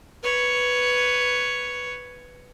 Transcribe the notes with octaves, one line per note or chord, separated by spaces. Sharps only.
B4 C#5